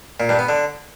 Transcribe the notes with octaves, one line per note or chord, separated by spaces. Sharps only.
A#2
G2
B3
D3